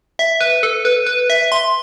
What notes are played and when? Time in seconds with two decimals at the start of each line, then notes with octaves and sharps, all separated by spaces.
0.19 E5
0.41 B4
0.63 A4
0.85 B4
1.07 B4
1.30 E5
1.52 C6